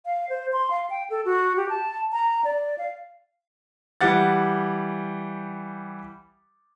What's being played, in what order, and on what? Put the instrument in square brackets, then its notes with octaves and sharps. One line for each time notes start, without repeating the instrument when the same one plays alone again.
[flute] F5
C5
C6
F5
G5
A4
F#4
G4
A5
A#5
D5
F5
[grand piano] E3 G3 G4 F#5 A6